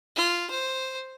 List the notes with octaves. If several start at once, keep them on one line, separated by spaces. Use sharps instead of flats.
F4
C5